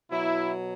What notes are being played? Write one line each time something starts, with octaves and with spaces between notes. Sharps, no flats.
B2 F#3 E4